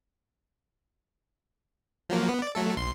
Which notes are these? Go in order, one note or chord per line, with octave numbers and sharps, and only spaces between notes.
F3 F#3 A#3
B3
D5
F#3 A3 A4
B1 C6